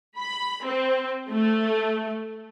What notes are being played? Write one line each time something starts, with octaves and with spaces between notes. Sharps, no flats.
B5
C4
A3